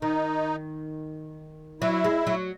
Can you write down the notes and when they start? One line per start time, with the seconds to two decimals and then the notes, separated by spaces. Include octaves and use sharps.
0.02 D#3 D#4
1.81 F#3 E4
2.04 G#3
2.27 F#3